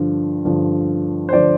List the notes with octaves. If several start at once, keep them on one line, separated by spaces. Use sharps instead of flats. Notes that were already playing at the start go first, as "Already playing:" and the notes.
Already playing: G2 D3 F3
G2 D3 F3
C5
D3 F3 D5